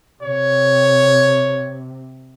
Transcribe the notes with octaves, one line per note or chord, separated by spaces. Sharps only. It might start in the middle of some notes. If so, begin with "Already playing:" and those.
C3 C#5